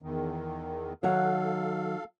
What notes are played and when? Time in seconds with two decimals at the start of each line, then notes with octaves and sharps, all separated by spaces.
0.02 E2 D#3
1.03 D#3 F#3 A4 F5 F#5